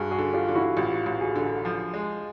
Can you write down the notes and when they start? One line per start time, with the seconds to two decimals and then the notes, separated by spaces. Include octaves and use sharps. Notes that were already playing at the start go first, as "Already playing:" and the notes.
Already playing: G2 F#4 G#4
0.11 F#4 G#4
0.19 D3
0.33 F4 G4
0.49 D3
0.55 E4 F#4
0.77 A1 F4 G4
1.06 A1
1.21 F#4 G#4
1.36 D3
1.65 F3
1.94 G#3